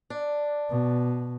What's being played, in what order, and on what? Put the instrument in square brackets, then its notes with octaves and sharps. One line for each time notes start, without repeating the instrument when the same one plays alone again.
[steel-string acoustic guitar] D4
[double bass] B2